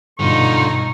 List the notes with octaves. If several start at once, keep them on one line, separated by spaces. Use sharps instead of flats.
G2 B2 D3 D#4 F4 C#6